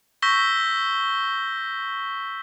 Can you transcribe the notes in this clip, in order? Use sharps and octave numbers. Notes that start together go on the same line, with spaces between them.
C#6 E6 G6 A#6 B6 G7